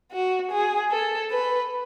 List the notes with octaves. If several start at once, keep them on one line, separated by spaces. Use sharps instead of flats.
F#4
G#4
A4
B4